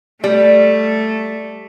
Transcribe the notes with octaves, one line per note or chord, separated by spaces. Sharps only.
G3 A3